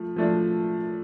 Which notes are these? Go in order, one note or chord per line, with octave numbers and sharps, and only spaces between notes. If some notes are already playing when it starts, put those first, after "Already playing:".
Already playing: F3 A3
F3 A3 D4